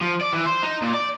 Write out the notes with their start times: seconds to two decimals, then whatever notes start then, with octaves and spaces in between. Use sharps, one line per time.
0.02 F3
0.21 D5
0.33 E3
0.46 C5
0.63 D#4
0.82 A#2
0.94 D5